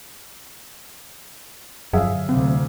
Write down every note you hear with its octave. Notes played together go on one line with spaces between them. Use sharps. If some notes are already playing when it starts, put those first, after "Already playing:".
G2 D3 F#3 G#4 E5 F5
D2 C3 C4